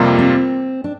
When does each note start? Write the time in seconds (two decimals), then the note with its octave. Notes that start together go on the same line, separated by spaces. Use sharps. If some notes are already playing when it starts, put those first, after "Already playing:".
Already playing: F2 C3 G3 A#3 F4
0.19 C4
0.84 D4